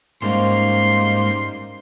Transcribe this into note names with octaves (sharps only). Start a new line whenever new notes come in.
G#2 G3 A#3 C#4 D#4 C5 F5 C6